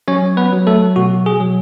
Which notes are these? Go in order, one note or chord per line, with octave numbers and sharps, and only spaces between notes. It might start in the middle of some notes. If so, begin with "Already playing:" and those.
F#3 C#4 C#5
B3 B4
F#3
A3 A4
B2 F#4
G#4
F#3